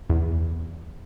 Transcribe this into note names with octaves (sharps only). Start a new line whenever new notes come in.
E2